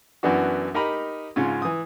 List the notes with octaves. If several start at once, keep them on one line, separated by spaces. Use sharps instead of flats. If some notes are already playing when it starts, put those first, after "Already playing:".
F#2 E3 B3 D4 F#4
D#4 G4 A#4 D#5 A#5 B5
G#2 C#3 C#4 F4
E3 D#6